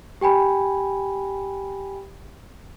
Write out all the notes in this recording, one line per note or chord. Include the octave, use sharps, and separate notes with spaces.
G4 G5 G#5 B5